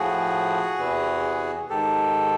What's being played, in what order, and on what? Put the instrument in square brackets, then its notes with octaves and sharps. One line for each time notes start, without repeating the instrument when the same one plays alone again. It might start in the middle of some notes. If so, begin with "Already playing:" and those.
Already playing: [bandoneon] A2 F3 F#4 G#4
E2 C3 E3
G#2 D#3 G4 A4